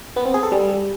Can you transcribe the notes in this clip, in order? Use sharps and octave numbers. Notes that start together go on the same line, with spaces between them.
B3
C4
G#4
A4
G3